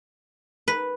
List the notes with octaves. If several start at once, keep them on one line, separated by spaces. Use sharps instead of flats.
B4